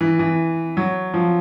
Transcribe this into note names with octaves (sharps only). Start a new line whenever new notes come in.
E3
E3
F#3
F3